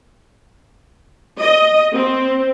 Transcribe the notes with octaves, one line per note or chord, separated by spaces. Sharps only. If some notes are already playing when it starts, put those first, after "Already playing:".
D#5
C4